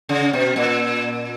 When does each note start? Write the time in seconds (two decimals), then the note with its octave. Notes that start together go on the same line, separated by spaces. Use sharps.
0.09 C#3
0.33 B2
0.56 A#2